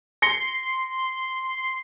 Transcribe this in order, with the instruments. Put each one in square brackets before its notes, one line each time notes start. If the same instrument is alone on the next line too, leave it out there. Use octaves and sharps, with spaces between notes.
[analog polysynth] C6 [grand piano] A#6 C#7 G7